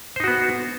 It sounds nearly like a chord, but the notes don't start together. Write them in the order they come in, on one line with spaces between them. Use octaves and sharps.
C5 D#4 F#4 B3